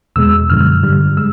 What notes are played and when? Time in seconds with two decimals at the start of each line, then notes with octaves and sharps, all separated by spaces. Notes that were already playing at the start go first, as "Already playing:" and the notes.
0.16 E2 B2 G#3 E6
0.49 F#2 D3 F3 F6
0.83 G2 D3 G3
1.17 G#3 E6